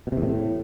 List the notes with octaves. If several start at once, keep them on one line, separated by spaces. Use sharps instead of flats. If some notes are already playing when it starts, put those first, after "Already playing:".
B2
C3
E2
A2